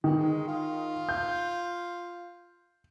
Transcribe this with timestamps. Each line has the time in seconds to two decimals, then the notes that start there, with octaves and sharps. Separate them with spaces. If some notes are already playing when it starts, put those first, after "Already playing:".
0.04 D#3 E3
0.18 G#3
0.48 F4
1.09 G6